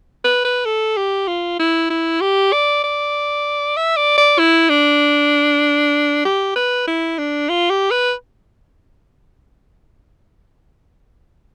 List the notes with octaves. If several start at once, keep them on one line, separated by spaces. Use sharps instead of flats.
B4
B4
A4
G4
F4
E4
E4
G4
D5
D5
E5
D5
D5
E4
D4
G4
B4
E4
D4
F4
G4
B4